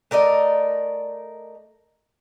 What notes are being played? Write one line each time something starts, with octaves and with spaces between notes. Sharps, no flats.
A3 A#4 D5 D#5